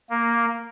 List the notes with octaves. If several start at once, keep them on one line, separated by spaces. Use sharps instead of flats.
A#3